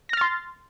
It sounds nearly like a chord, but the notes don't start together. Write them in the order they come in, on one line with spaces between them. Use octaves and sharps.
A#6 F6 A6 C6